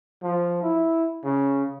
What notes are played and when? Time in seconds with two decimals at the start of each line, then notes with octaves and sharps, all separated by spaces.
0.22 F3
0.63 E4
1.24 C#3